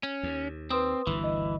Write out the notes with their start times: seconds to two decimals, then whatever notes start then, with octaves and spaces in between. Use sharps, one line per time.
0.03 C#4
0.23 D#2
0.70 C4 B4 C6 D#6
1.07 G1 D2 E3
1.24 D#5